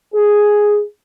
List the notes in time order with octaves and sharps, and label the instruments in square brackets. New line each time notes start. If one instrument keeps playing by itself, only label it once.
[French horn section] G#4